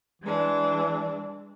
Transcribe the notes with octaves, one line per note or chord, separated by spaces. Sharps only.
E3 G#3 D4